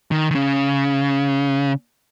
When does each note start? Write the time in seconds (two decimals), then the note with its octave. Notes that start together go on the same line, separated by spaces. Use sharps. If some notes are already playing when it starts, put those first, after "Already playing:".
0.11 D#3
0.31 D#3
0.35 C#3